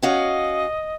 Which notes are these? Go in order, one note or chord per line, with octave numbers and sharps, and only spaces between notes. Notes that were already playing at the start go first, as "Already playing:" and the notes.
C#4 F#4 D#5 F5